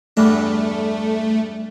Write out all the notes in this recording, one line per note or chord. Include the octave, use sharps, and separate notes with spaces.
E2 G2 A3 D4